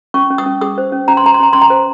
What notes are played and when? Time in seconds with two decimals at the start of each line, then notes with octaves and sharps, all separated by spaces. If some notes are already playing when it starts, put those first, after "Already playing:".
0.14 C#4 C#6
0.30 C#4
0.38 D#6
0.46 C#4
0.61 G#4 D#6
0.78 C5
0.92 C#4
1.08 C#4 A#5
1.17 C6
1.24 C#4 A#5
1.34 C6
1.40 C#4 A#5
1.53 C#4 C6
1.62 A#5
1.70 C5